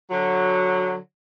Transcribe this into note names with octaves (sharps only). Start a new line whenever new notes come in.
D3 F#3